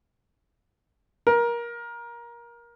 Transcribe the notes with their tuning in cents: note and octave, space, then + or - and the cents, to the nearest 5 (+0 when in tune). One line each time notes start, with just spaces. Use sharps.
A#4 +20